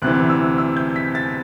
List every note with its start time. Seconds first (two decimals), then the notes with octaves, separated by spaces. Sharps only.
0.02 D2 C3 E3 F#6
0.30 E6
0.58 E6
0.77 G6
0.96 B6
1.15 A6